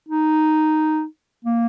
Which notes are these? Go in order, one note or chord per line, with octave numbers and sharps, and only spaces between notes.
D#4
A#3